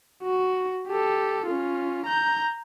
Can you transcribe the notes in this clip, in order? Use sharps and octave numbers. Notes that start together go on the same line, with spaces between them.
F#4
G4 A4
C#4 F4
A#5 G6